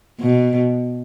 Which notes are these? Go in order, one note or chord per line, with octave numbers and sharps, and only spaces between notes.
B2